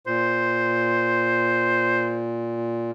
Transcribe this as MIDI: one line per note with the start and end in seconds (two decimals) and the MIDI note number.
0.07 2.91 46
0.07 2.22 72